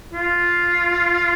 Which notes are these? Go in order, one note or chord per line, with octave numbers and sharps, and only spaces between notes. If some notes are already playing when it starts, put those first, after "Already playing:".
F4